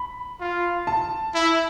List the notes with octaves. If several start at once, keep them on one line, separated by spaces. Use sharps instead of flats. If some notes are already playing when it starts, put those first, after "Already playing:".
Already playing: B5
F4
A5
E4